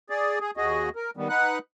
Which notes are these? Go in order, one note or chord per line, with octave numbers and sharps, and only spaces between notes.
G#4 D5
G#4
D#2 F#4 G#4 D#5
A#4
D#3 G3 B3
D#4 B4 F#5 F#6